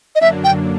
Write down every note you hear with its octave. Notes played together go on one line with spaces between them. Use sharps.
D#5
F#2 D3 F#3 A#3 D4 E5
G5